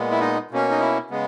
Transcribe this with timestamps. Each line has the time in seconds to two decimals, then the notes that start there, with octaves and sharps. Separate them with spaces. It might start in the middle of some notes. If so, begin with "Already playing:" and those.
Already playing: A#2 G#3 B3
0.11 E4
0.20 D#4
0.51 B2 A#3 C#4
0.71 D#4
0.80 E4
1.10 C#3 G#3 B3